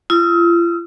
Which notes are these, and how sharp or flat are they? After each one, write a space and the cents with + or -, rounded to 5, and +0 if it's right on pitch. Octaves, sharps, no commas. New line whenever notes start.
F4 -40 D#6 +45